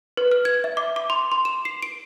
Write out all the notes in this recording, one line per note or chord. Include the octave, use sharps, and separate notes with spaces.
B4
F6
G#6
E5
D6
D6
C6
C6
E7
C7
D7